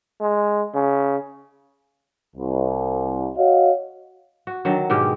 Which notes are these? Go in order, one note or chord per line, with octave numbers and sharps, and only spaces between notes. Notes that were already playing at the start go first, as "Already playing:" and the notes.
G#3
C#3
C2
F#4 C#5 D#5 F5
F#4
D3 D#3 F#3
G#2 B2 G#3 G4